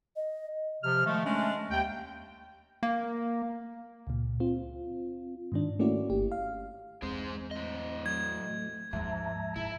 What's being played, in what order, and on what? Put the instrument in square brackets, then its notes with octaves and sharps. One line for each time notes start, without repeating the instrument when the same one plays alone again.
[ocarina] D#5
[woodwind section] C3 F3 F6
D#3 F3 G#3 A3
G#3 A3 C#4 D4
D#2 G5
[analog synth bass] A#3
[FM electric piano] C#2 A#2
C4 F4
G#2 D#3 D4
A3 A#3 C#4 E4 F#4 D5
G1 G4
F5
[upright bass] E2 [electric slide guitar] G#3 G#4 C5 [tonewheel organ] C4
[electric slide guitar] A2 D#5
[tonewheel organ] F#3 A3 [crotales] G#6
[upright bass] D#2 F3 [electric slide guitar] G#2 [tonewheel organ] E5 A5 A#5
[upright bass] G#2 [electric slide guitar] E4